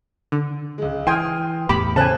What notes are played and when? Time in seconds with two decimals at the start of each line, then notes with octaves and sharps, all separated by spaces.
0.32 D3
0.78 C#2 G#3
1.07 E3 G5 G#5 C6 D#6 F6
1.69 E2 A2 B3 G4 B5
1.96 C#3 A3 C5 G#5 A5 F#6